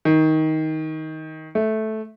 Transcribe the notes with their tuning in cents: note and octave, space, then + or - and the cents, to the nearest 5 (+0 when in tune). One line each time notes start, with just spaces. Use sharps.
D#3 +15
A3 -10